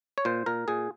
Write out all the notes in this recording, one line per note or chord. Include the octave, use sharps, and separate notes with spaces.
C#5
A#2 C5
A#2 A#4
A#2 G#4